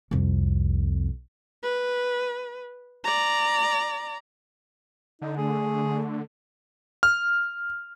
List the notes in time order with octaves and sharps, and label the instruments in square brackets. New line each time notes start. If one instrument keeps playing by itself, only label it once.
[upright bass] C2 F2
[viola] B4
D5 A#5
[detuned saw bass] D3 [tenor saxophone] D#4
[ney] A3 [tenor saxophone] G#4
[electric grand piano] F6